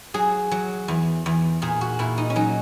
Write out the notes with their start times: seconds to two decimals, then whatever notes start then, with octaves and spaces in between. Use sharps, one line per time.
0.14 F#3 G#4
0.51 F#3
0.88 E2
1.26 E2
1.62 A#2 G#4
1.81 F#4
1.99 A#2 E4
2.18 D#4
2.30 C#4
2.36 F#3 D#4